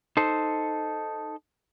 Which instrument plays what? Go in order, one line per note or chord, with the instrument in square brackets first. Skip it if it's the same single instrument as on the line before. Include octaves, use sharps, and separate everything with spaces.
[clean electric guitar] D#4 A4 C5